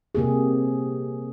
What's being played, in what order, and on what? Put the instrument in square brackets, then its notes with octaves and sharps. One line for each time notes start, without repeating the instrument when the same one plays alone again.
[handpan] C3 A#3 G4 G#4